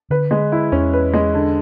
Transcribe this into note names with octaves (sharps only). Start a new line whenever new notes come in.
D3 B4
G#3
E4
E2 C#4
B4
G#3
D3